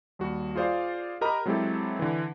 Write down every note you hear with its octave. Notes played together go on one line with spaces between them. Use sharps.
D#2 G3 F#4
F4 G#4 C5 D5 F5
G4 A#4 D#5 A#5 B5
F#3 G#3 C4 E4 G4 A4
D3 E3